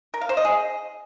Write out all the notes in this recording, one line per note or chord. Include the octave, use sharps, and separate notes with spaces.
A#4
F5
C5
D#5
G#4